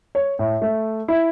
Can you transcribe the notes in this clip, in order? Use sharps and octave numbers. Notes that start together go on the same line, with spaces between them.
C#5
A2
A3
E4